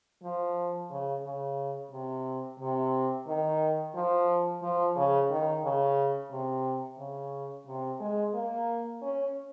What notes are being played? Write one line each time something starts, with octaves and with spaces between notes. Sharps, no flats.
F3
C#3
C#3
C3
C3
D#3
F3
F3
C#3
D#3
C#3
C3
C#3
C3
G#3
A#3
C#4